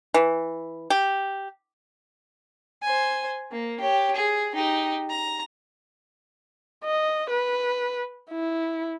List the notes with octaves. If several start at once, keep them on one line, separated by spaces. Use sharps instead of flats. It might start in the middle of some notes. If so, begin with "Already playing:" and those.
E3
G4
C5 G#5
A#3
G4 C#5
G#4
D#4 G4
A#5
D#5
B4
E4